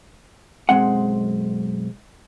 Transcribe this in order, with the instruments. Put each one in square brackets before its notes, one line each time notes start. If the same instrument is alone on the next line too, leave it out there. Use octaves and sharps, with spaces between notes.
[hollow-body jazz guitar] B1 F#2 A#2 G#3 C4 F#5